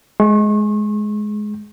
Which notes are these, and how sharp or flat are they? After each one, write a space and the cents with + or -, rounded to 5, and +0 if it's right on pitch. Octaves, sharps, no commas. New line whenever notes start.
G#3 +15 C#6 -40